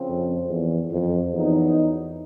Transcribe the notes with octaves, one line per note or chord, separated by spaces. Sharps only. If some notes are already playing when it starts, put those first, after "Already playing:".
Already playing: C#3 F3 C4
F2
E2
F2
E2 F#3 B3 D#4